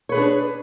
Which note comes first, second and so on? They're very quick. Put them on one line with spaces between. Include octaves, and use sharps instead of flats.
C#5 B4 G#4 D4